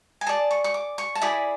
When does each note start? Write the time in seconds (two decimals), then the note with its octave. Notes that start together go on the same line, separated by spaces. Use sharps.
0.21 G#5
0.26 G#4 D5 A5
0.51 C#6
0.64 C#6
0.74 D6
0.98 C#6
1.15 A5
1.22 E4 G#4 D5 B5